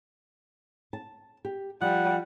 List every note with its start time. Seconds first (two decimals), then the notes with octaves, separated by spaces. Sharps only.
0.93 A5
1.45 G4
1.81 F3 G3 F#5